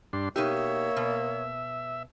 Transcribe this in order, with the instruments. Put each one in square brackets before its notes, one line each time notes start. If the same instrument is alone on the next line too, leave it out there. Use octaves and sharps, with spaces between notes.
[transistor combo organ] G2 D4 C6
[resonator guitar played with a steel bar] B2 D#4 G4 [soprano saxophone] A#3 [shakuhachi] C#5 [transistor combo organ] E5
[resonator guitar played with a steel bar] B2